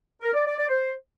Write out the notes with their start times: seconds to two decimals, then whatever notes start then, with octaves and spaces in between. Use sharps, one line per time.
0.22 A#4
0.34 D5
0.45 D5
0.57 D5
0.69 C5